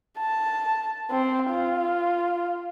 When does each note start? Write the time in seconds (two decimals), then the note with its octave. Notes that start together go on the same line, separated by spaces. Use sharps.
0.19 A5
1.11 C4
1.51 F4